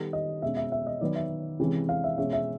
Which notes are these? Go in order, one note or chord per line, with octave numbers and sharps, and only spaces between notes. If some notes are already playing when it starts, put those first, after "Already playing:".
Already playing: D#3 G3 B3 A4
D#5
B2 G#3 C#4 E5
E5
E5
D#5
D#3 F#3 B3 D5
E5
C3 E3 G#3 C#4
F5
E5
B2 G#3 C#4 E5
E5